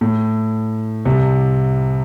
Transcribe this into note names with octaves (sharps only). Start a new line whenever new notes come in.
A2
C2 C3